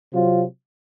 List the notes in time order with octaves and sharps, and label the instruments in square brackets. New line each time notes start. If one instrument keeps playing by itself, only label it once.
[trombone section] C3 F#3 C4 F4